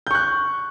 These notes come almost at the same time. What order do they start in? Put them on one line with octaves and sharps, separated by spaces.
G6 C#6 F#6